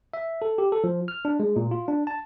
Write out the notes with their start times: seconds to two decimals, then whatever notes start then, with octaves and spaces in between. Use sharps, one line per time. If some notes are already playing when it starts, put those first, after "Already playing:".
0.14 E5
0.42 A4
0.58 G4
0.72 A4
0.84 F3
1.08 F6
1.25 D4
1.40 G#3
1.56 A#2
1.71 F4
1.88 D4
2.07 A5